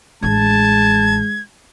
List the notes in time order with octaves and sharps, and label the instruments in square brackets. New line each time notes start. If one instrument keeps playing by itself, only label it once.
[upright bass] A1 D4 [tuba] G#3 [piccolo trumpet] A5 [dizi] G#6